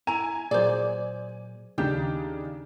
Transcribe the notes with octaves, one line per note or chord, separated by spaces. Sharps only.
E4 G#5 A#5
A#2 F#3 G#4 C5 D5
D#2 C#3 D4 D#4 G4